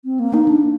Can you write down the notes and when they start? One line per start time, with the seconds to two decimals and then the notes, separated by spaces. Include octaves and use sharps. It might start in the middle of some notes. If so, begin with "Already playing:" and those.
0.05 C4
0.20 A#3
0.34 D#4
0.48 D4